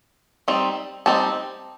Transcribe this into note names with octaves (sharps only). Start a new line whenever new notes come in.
G3 C4 D#4
G3 C4 D#4 A5